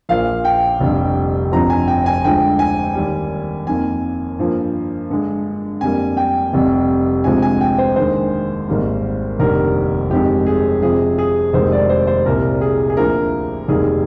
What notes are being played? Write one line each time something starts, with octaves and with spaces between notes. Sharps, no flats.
A#1 A#2 F3 A#3 F5
G5
F1 F2 D3 G3
G1 F2 D3 F3 A#5
G#5
G5
G#5
D2 D3 F3 G#3 G5
G#5
D#2 D#3 G3
F2 D#3 A#3 G#5
G2 F3 A#3
G2 D3 G#3
F2 D3 G3 A#3 G#5
G5
F1 F2 C3 G3
D2 C3 F3 G#3 G#5
G#5
G5
C5
D#2 D3 G#3 C5
G#1 G#2 G3 A#3
F1 D#2 D3 G3 A#4
G1 F2 D#3 G#3 G4
G#4
F2 C3 F3 G#4
G#4
F1 D#2 D#3 G#3 C5
D5
C5
C5
C2 A#2 G3 A#4
G#4
G#4
D2 D3 F3 A#3 A#4
F1 D#2 D#3 G3 A#3 G#4